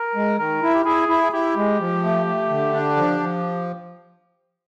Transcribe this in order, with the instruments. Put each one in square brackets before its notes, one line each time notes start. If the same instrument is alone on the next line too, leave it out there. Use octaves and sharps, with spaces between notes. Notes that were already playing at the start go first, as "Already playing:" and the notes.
Already playing: [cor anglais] A#4
[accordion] G#3
[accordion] D#3 [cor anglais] A#4
[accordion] E4
[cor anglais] G4
[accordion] E4 [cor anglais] G#4
[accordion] E4
[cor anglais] G#4
[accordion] E4 [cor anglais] G4
[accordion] G#3
F3
A3
A3
D3
D4
F3
F3